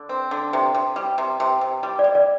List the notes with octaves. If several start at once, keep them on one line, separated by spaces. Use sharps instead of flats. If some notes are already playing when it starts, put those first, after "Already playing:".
Already playing: D3
C4
D3
C3
C3
G3
C3
C3
C3
G3
D5
G3
D5